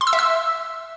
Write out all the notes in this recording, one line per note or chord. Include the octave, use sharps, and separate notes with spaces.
C6
E6
E5
E6